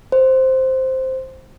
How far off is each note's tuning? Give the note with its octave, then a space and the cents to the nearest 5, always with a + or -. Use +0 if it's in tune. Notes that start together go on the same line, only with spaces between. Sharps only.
C5 +0